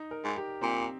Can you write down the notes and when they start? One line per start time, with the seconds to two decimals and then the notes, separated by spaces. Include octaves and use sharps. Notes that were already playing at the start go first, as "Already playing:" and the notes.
Already playing: D#4
0.11 A#4
0.24 G#2
0.37 G4
0.61 A#2 C4